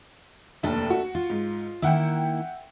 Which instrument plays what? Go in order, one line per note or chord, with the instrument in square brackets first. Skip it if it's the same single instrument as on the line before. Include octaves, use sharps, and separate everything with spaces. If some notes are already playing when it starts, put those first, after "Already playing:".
[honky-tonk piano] F1 D#2 [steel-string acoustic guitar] D4 A4 E5
[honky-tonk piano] F#4
[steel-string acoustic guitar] F4
[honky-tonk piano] G#2
[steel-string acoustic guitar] D#3 A#3 E4 [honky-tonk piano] E5 F#5 G5